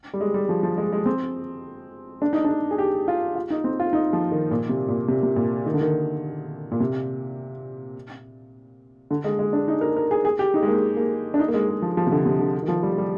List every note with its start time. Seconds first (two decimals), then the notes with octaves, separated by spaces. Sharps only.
0.14 G3
0.21 G#3
0.34 G3
0.49 F3
0.63 F3
0.77 G#3
0.93 G#3
1.06 C4
2.22 D4
2.33 D#4
2.45 D4
2.71 G#4
2.78 G4
3.08 F4
3.35 F4
3.50 D#4
3.64 C4
3.80 F4
3.93 D#4
4.13 F3
4.31 D#3
4.51 A#2
4.69 C3
4.88 A#2
5.08 C3
5.23 C3
5.36 A#2
5.66 D#3
5.74 D3
5.81 D#3
6.72 A#2
6.80 C3
9.11 D3
9.24 G#3
9.39 G#3
9.53 D4
9.68 D#4
9.81 A#4
9.96 A#4
10.11 G#4
10.25 G#4
10.39 G4
10.54 D#4
10.63 G#3
10.68 A#3
10.97 A#3
11.34 D4
11.39 D#4
11.48 A#3
11.54 G#3
11.68 G#3
11.82 F3
11.97 F3
12.07 C3
12.12 D3
12.26 C3
12.39 D3
12.63 D#3
12.68 F3
12.83 G3
12.98 G3